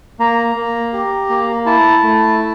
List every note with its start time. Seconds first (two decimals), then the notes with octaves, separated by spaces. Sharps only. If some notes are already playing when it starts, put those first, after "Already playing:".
0.19 A#3 A#5
0.56 A#3
0.93 G4
1.29 A#3
1.66 E4 A5
2.02 A3
2.39 E4